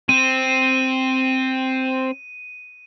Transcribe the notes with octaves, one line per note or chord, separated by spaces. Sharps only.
C4 D#7